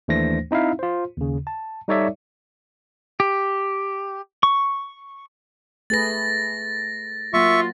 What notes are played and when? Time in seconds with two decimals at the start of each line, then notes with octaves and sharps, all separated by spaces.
0.08 D#2 E3 A3 D4 C5 A#6
0.51 C4 D#4 E4 E5 F5
0.79 F4 C5
1.17 D#2 C#3
1.47 A5
1.88 G3 D#4 A4 C#5 D5 E5
3.20 G4
4.43 C#6
5.90 A3 G#4 B4 A6 A#6
7.34 F#3 A#3 F4 E5 F#5 C#6